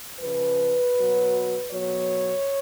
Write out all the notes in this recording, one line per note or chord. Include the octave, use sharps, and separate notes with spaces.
C#3 F3 B4
B2 F#3
B2 F#3 C#5